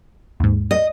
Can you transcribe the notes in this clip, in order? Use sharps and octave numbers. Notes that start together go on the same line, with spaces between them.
D#2 G#2
D#5